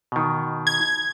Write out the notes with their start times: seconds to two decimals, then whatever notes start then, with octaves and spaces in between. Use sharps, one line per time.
0.12 B2 D#3
0.67 G#6